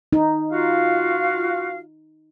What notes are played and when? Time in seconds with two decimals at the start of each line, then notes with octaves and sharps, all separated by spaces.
0.13 D#4
0.53 F4 F#4 F5